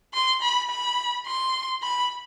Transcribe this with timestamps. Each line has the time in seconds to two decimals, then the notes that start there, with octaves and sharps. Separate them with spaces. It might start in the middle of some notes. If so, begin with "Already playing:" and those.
0.14 C6
0.42 B5
0.70 B5
1.27 C6
1.83 B5